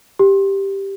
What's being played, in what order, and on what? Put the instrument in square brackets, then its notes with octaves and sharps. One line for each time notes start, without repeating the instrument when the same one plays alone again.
[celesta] G4